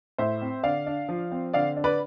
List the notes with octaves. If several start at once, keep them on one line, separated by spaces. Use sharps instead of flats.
A2 C5 E5
C4
D3 D5 F5
D4
F3
C4
D3 D5 F5
D4
B4 D5